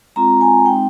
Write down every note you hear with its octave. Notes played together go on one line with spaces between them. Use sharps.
G#3 C4 F4 A#5
G#5
G#3 C4 D#4 G5